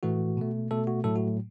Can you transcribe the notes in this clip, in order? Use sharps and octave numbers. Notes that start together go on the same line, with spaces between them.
A2 E3 A3 F#4
B2 A3
B2 A3 A4
F#4
A2 F#3 A3 A4
F#4